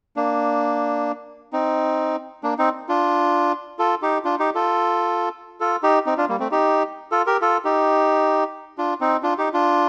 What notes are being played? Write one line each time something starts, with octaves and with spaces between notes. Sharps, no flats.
A#3 D4
C4 D#4
A#3 D4
C4 D#4
D4 F4
F4 A4
D#4 G4
D4 F4
D#4 G4
F4 A4
F4 A4
D#4 G4
C4 D#4
D4 F4
G3 A#3
A3 C4
D#4 G4
F4 A4
G4 A#4
F4 A4
D#4 G4
D4 F4
C4 D#4
D4 F4
D#4 G4
D4 F4